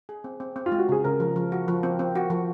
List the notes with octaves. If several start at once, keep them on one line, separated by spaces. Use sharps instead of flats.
G#4
C4
C4
C4
F4
G#3
F#4
C#3 G#4
C#3 A#4
F3
F3
F#4
F3
C4
C4
F#4
F3